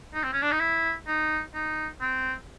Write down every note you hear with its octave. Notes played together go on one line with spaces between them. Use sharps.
D#4
C4
C#4
D4
D#4
E4
D#4
D#4
C4